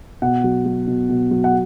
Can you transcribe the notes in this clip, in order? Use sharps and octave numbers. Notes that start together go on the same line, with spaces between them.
B2 F#5
F#3
F#3
B2
B2
F#3
F#5